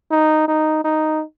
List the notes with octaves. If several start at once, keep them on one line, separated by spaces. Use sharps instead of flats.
D#4
D#4
D#4